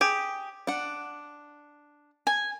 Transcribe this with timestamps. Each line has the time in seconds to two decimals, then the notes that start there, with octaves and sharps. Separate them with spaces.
0.01 G4 G#4
0.67 D4 F#5
2.27 G#5